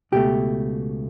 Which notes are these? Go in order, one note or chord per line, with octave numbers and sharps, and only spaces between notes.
C#2 B2 A3 G4